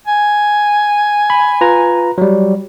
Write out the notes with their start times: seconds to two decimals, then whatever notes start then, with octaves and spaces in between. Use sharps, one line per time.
0.07 G#5
1.30 B5
1.61 F4 B4 A#5
2.18 F#3 G3